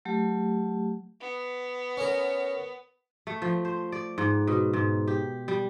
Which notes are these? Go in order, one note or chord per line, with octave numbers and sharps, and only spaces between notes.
F#3 A3 G4
B3
C#4 A#4
A3
F3
C5
D5
G#2
B2
G#2
G4
G3